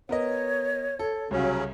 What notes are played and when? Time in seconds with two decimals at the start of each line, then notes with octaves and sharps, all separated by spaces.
0.09 B3 A#4 C#5 D#5
0.99 A4
1.31 C2 C#3 F#3 C#4